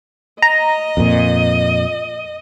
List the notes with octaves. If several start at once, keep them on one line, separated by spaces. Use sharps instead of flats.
D#5 A#5
F2 A#2